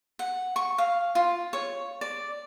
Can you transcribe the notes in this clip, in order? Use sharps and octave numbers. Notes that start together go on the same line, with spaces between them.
F#5
C#6
F5
F4
C#5
D5